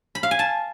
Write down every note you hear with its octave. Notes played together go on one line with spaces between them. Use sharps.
B5
F5
G#5
A5